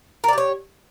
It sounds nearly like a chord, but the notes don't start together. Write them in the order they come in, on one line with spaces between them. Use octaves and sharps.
A#4 D5 G4 C#5